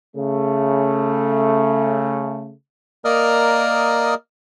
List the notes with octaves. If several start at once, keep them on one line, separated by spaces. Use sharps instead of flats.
C#3 A3
A#3 A#4 D5 D#5 D#6 F6